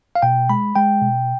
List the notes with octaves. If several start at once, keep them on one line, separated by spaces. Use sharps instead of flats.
F5
B2 G5
G#3 B5
G#3 G5
B2